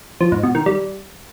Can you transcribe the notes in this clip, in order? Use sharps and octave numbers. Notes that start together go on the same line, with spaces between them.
F3
G#2
B2
D#3
G3